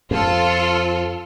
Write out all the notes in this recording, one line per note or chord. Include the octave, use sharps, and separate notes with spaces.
F2 F4 A4